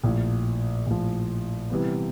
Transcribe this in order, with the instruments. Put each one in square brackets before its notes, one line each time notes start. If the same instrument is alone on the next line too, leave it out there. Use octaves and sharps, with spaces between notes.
[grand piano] A#1 A2 F3
A#1 A2 F3
C3 E3 G3 B3